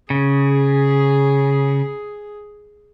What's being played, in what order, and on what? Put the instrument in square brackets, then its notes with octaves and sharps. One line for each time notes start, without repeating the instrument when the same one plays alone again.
[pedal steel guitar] C#3 [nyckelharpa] G#4